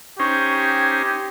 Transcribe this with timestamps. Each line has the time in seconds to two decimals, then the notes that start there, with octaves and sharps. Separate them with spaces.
0.19 C#4 D#4 G4 C5 C#6
0.63 G#6